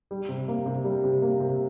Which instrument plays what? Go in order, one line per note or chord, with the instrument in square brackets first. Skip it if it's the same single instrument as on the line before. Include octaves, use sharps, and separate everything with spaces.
[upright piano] G3
C3
A#3
C3
G3
C3
A#3
C3